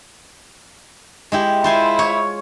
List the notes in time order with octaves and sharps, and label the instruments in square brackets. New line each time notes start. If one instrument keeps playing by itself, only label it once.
[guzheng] G#3 E4 G4
[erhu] E4 [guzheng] F4 C5 G#5
[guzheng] C#5